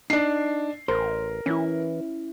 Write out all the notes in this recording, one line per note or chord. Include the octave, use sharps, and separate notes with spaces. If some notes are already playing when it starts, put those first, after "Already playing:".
D4 D#4 C7
A1 A#4 C5
E3 C#4 E4